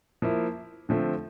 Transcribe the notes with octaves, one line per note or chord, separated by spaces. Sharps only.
F3 A#3 E4
D3 F3 A3 C4